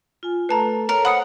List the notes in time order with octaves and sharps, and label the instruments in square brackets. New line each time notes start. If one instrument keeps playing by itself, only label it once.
[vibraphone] F4 G#5
[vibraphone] A3 A4 [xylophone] B4 A5 A#5
[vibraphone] A4 C#5 [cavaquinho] A#4
[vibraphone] C5 [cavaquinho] F#5 [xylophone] B5 D#6 C#7